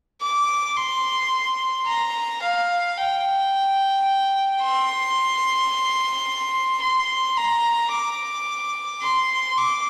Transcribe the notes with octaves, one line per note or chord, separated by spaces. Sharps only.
D6
C6
A#5
F5
G5
C6
C6
A#5
D6
C6
D6